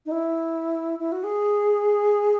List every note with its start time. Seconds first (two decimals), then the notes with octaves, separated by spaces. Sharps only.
0.06 D#4
0.12 E4
0.99 E4
1.12 F#4
1.24 G#4